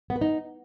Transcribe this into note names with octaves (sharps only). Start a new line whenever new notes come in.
B3
B4
D#4